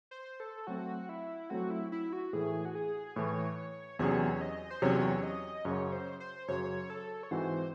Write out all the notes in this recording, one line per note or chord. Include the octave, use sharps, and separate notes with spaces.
C5
A4
F#3 A3 C4 F#4
E4
F#3 A3 C4 F#4
E4
E4
F#4
A2 E3 A3 G#4
F#4
G#4
A2 E3 A3 C#5
E2 C3 F#3 C#4 G#4 C#5
D#5
C5
E2 C3 F#3 C#4 G#4 C#5
D#5
F#2 C#3 F#3 C#5
C5
C5
F#2 C#3 F#3 C#5
A4
C#5
G#2 E3 C4 F#4 C5